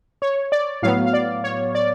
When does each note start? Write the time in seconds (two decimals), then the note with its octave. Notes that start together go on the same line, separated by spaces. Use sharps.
0.22 C#5
0.52 D5
0.82 A2 F#3 B3 F5
1.06 F5
1.13 D5
1.44 C#5
1.75 D5